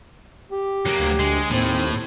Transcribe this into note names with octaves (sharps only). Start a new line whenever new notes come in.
G4
F#3 A#3
D2
G#3
D#2 A2 C4